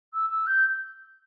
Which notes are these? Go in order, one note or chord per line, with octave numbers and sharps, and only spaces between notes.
E6
E6
G6